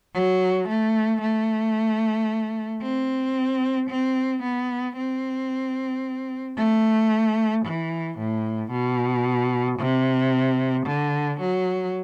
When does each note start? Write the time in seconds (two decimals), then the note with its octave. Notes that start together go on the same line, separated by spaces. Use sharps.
0.14 F#3
0.67 A3
1.21 A3
2.81 C4
3.89 C4
4.42 B3
4.96 C4
6.57 A3
7.64 E3
8.17 A2
8.71 B2
9.79 C3
10.85 D3
11.39 F#3